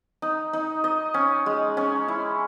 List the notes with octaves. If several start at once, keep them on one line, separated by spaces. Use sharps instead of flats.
D#4
D#4
D#5
C#4
G#3
C#4
E4